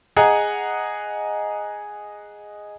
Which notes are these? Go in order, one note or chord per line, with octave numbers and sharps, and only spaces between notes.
G#4 D#5 F#5 G#5 A#5